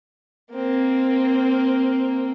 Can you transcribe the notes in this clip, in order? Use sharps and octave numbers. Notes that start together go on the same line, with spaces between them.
A#3 C4